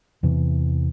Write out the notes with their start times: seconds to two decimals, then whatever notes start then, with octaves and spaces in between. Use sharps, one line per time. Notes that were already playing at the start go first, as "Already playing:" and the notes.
0.23 E2 C3 E3